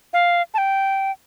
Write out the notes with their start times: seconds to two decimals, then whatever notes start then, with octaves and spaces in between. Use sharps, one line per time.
0.13 F5
0.54 A5
0.58 G5